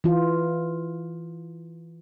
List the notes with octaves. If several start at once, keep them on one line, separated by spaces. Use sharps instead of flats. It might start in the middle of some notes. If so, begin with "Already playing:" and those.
E3 F4